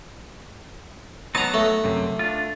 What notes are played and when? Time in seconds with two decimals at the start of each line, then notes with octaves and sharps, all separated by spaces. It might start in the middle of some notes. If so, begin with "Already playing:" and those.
1.35 F#3 B3 D#4 A5 A#5
1.54 A3
1.84 F#2 C3
2.19 D4 F4